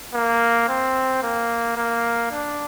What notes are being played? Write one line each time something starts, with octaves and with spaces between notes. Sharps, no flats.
A#3
C4
A#3
A#3
D4